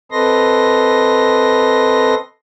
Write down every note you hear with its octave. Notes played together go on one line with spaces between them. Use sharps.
C4 A4 B4 D#5 C6 A#6